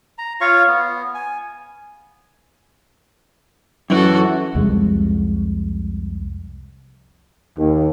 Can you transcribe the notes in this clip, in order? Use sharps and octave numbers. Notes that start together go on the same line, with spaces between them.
A#5
F4 C#5 F5 C#6
B3
G#5
F#2 E3 F#4 A4
C2 F2 G3 G#3
D#2